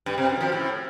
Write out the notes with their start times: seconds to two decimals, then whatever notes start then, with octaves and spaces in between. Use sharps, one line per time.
0.06 G2
0.18 C3
0.29 F#2
0.41 F3
0.52 A2